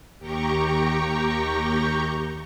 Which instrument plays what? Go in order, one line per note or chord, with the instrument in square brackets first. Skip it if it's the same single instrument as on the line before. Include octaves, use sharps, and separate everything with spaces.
[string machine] D#2 G4 G5 A#5 C#6